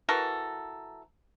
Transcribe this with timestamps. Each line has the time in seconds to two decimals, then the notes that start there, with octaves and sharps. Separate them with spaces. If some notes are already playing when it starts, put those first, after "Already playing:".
0.09 E3 F#4 A4 A#4